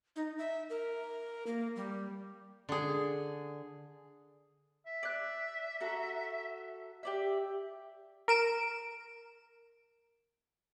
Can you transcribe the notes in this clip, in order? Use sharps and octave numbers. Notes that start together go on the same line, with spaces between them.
D#4
E5
A#4
A#3
G3
D3 G#4
E5
D5 F#6
F#4 A4 A#5
G4 D5 E5
A#4 D7 E7